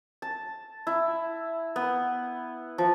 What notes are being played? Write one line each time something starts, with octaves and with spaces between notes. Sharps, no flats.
A5
E4
B3
F3